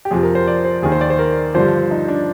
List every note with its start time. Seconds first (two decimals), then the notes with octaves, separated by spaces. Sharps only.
0.05 G4
0.11 F2 C3 F3 G#4
0.23 A#4
0.35 C5
0.47 D5
0.65 C5
0.82 D#2 D#3 G#4
0.92 C5
1.01 D5
1.10 C5
1.19 A#4
1.55 G2 D3 F3 C5
1.91 D#4
2.08 D4